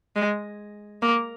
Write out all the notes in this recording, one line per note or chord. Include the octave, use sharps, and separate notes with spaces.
G#3
A#3